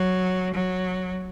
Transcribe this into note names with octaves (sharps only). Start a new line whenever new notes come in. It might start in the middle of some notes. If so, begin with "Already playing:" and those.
Already playing: F#3
F#3